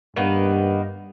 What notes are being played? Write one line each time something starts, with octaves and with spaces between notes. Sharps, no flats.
G2 D#3 A#3 B3